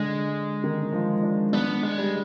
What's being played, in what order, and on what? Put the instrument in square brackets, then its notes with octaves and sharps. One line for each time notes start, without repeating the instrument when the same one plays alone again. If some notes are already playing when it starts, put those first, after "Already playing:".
Already playing: [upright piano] D3 [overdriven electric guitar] G#3
[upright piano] D#3
F3
D4
[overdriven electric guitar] B3 [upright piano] D4
[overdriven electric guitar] G#3
[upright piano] G3